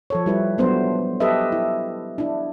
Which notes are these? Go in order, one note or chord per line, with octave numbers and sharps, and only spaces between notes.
F3 A4 C#5
G3 E4 B4
F#3 A3 B3 D4 C5
G4 A4 B4 D#5 E5
E4
D4 E4